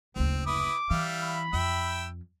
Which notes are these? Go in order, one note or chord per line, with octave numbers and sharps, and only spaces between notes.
F#1 D2 C4
E4 B4 D6 D#6
E3 G3 E5 F5
B5
F2 E5 G5 E6